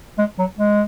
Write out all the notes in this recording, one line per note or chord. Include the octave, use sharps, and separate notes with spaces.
G#3
F#3
G#3